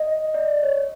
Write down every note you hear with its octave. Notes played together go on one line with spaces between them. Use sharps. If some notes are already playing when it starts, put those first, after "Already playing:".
Already playing: D#5
D5
C#5